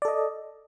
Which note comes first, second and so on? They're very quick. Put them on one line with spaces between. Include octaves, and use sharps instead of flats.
D5 A4 D#5